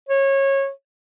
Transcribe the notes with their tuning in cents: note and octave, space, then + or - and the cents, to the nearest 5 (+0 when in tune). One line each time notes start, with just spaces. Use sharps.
C#5 -20